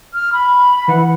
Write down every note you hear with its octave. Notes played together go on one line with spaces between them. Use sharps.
F6
B5
E3 F#5